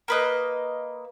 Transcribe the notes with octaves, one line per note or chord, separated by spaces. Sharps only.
A#3 B4 D#5